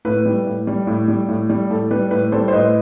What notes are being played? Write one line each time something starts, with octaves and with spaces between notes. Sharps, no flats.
A2 B4
G3
A2
G3
A2
G3
A2
G3
A2 A4
G3 B4
A2 B4
G3 A4 C5
C5
A2 B4 D#5